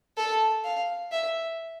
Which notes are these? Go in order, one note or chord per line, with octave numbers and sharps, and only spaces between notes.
A4
F5
E5